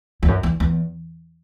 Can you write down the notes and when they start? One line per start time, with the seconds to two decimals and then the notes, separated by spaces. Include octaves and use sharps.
0.23 E2
0.28 F#2
0.43 E2
0.60 E2